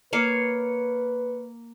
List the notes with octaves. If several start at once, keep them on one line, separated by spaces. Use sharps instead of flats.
A#3 B4 C#5 F5